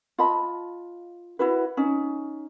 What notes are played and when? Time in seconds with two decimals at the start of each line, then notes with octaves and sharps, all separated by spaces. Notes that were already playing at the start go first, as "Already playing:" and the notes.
0.18 F4 D#5 A5 B5
1.39 E4 F#4 B4
1.77 C#4 D#4